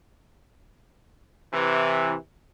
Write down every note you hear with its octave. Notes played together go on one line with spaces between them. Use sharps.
C3 E3